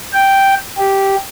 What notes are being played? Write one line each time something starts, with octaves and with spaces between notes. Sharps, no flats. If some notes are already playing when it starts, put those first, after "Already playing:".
G5
G4